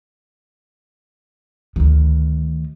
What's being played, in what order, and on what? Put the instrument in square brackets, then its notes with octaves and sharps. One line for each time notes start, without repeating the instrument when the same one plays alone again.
[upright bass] D2 D#3